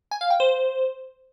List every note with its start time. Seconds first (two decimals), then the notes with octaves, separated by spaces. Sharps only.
0.11 G#5
0.21 F5
0.30 G5
0.40 C5